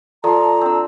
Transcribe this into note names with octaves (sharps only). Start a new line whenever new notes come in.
F3 A4 D5 A5 A#5 C6
C4 D4 E6